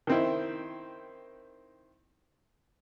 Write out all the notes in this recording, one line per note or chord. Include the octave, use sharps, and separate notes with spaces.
D#3 C4 E4